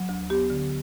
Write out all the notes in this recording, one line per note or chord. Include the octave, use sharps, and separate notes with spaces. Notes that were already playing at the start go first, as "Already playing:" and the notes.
Already playing: F#3
D2
B3 G4
D3